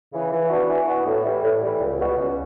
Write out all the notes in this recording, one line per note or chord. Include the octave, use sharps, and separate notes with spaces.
C#3 E3
E3
B3 D4 F#4
E3
B3 D4 F#4
A2
E3 G3
A2
E3 G3
C#2
B2 G3 B3 F#4
C#2